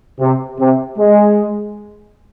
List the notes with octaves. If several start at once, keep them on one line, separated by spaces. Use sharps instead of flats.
C3
C3
G#3